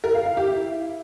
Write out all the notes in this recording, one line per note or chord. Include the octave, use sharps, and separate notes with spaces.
A#4
F5
F5
G4
E4